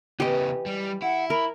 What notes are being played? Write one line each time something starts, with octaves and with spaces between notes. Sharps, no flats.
C#3 E3 B3 G4 D#5
G3
E4 F#5
A#4 B5